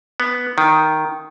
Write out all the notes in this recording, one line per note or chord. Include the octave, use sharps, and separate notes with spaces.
B3
D#3